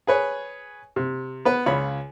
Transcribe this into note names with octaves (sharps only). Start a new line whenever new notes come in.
G#4 B4 C#5
C3
B3 B4
C#2 F4 C#5 B5